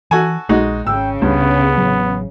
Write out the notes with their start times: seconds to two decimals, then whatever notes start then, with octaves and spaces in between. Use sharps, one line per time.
0.11 E3 F#4 A4 G#5
0.49 A#1 G#3 D#4 F#4
0.87 G#1 C#3 G5 E6
1.22 C#2 G2 B3
1.77 A1 F#3